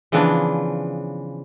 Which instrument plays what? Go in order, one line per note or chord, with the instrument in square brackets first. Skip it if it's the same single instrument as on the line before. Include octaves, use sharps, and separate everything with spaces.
[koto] C#3 E3 F3 B3 D4